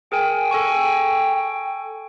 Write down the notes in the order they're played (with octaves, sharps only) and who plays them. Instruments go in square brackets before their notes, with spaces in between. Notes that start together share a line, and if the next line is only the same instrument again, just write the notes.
[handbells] G#4 A#4 G#5 [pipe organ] G5
[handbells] A4 G#5 C#6